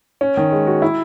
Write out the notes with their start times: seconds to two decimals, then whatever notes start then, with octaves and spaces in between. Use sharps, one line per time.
0.21 C#4
0.37 D#3
0.52 G#3
0.67 F#4
0.82 E4